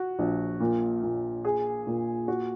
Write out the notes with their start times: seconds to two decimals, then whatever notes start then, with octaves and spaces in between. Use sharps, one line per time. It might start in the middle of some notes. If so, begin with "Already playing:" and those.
Already playing: F#4
0.19 A#1
0.60 A#2
1.03 A#2
1.45 G#4
1.87 A#2
2.28 F#4